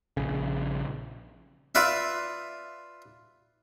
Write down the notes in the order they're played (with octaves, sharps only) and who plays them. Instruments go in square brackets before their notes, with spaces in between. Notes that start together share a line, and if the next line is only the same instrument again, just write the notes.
[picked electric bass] A#1 C#3
[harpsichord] F4 B4 D5 E5